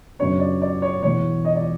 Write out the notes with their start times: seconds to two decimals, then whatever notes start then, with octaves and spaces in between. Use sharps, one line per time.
0.19 F#2 C#3 F#3 B3 D4 C#5
0.40 D5
0.62 D5
0.82 C#5
1.03 E1 E2 B2 C#5
1.45 D#5
1.56 D5